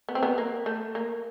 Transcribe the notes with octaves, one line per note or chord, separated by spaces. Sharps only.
B3
C4
B3
A#3
A3
A#3